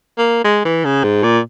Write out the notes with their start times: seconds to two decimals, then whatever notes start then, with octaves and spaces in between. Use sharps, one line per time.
0.18 A#3
0.44 G#3
0.65 E3
0.85 C#3
1.04 G#2
1.23 A#2